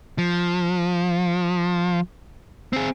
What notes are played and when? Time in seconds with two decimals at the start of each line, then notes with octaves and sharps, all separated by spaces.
0.18 F3
2.73 C4 G#4